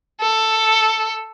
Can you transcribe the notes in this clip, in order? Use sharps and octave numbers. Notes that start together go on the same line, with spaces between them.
A4